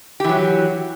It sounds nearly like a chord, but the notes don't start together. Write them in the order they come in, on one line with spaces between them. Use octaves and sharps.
G4 E3 F#3